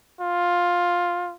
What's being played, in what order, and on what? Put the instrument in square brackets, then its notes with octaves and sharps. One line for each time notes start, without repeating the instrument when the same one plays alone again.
[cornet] F4